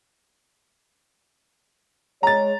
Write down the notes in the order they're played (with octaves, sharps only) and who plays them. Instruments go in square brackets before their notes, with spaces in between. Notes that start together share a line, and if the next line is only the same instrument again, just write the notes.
[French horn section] G#3 C#5 [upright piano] A#5 A6